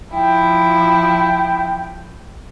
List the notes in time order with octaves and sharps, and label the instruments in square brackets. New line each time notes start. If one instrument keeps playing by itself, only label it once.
[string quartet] F3 E4 [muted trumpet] G5